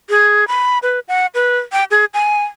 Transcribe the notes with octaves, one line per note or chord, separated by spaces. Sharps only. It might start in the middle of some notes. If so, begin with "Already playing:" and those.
G#4
B5
B4
F#5
B4
G5
G#4
G#5